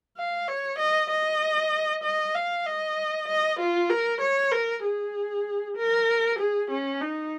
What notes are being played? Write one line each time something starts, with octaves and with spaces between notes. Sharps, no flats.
F5
C#5
D#5
D#5
D#5
F5
D#5
D#5
F4
A#4
C#5
A#4
G#4
A#4
G#4
C#4
D#4